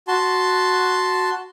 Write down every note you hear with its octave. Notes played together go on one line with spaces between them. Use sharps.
F#4 A5 C6